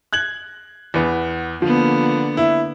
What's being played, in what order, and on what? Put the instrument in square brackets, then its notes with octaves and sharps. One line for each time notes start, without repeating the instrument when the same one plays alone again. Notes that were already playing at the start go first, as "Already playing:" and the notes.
[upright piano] F#6 G#6 F#7
E2 B3
[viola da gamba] D3 A#3 B3 [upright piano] F3
[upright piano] E4